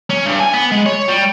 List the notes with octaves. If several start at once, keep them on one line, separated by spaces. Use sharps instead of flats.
C#4
G2
G#5
B3
G#3
C#5
G3